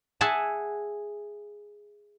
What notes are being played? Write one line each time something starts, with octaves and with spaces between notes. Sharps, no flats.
G#4 E5 F#5 G#5 A5